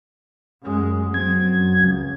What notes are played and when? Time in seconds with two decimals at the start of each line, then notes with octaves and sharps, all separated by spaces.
0.62 F#2 G#3
1.14 F#3 C4 G#6
1.45 F#2
1.78 C#2